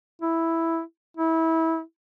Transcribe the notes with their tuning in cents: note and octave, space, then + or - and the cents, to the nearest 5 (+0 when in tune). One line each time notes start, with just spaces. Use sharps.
E4 +0
E4 -25